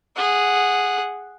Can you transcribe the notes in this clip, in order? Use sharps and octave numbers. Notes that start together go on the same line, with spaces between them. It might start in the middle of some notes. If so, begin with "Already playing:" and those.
G#4 F#5